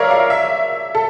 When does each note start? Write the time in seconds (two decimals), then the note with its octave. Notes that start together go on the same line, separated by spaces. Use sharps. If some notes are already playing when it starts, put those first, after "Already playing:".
Already playing: A#4 C#5 D5 E5 F5
0.11 F5
0.30 E5
0.95 A4